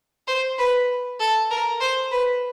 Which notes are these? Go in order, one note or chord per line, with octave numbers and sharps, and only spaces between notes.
C5
B4
A4
A#4
C5
B4